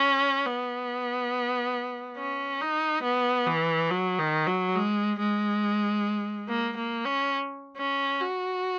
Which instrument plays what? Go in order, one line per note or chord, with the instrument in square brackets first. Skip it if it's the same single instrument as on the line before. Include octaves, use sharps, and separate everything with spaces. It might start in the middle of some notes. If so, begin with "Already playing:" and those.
Already playing: [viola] C#4
B3
C#4
D#4
B3
E3
F#3
D#3
F#3
G#3
G#3
A#3
A#3
C#4
C#4
F#4